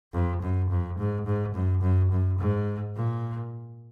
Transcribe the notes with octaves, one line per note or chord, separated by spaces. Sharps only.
F2
F#2
F2
G#2
G#2
F#2
F#2
F#2
G#2
A#2